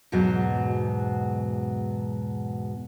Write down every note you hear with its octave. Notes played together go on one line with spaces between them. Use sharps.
E2 G#2 B2 F#3